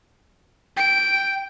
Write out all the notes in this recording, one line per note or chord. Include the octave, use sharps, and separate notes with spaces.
G5 D7